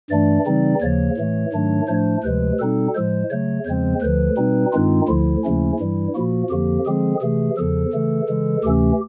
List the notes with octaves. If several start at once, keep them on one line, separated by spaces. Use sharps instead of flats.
G2 E3 A3 D4 D5
C#3 E3 G3 C4 D#4
D#2 C#3 F3 A#3 C#5
A2 E3 A3
G#2 D#3 F#3 A3 D4
A2 F3 A3 D4 C5
D2 C3 F3 G#3 B4
B2 G3 C4 D#4 A4
A2 F3 G#3 C5
C#3 F#3 A3 C#5
E2 C#3 F3 G#3 C4 C5
D2 D3 F3 B4
B2 G3 C4 D#4
G2 D#3 G#3 C4 D#4 F4
D2 D3 F3 E4
D#2 C#3 F3 A3 C#4
G2 E3 G3
A#2 F3 A#3 F#4
F2 D3 F3 A#3 G4
D3 F3 G#3 C4 G#4
C3 E3 A3 G#4
E2 C#3 F3 A4
C#3 E3 A3
C#3 E3 G#3
D2 C3 E3 A3 C#4 G4